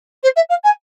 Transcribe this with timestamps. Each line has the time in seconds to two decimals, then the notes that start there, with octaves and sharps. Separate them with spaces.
0.23 C5
0.36 E5
0.49 F5
0.64 G#5